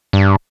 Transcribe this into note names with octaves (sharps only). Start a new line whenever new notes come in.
G2